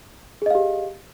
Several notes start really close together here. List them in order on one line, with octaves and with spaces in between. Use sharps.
G#4 D#5 F5 G4